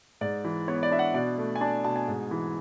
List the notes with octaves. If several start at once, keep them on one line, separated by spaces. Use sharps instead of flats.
G#2 D5
E3
B3 C#5
D5
D4 E5
F#5
B2 D5
A3
G#5
D4 A5
B2 A5
G#5
G#2
E3